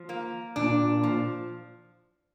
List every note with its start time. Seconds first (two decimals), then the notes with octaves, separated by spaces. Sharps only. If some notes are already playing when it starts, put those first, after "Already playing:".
Already playing: F3
0.09 A#3
0.56 A#2 D4
1.03 F3